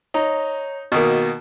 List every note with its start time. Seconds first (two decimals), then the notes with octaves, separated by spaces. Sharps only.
0.14 D#4 C#5 A#5
0.92 B2 D#3 A#3 F#4